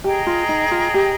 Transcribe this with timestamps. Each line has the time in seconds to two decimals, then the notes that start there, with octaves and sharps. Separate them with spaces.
0.04 G4 G#4 D#5 G5 A#5
0.27 F4
0.49 D#4
0.71 F4
0.94 G4